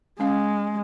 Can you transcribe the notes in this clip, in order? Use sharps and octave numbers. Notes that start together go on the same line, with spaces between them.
G#3 C#4 F5